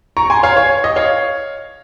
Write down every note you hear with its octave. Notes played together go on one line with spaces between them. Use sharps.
A#5 C#6
G#5 C6
C#5 F5
C#5
D#5
C#5 F5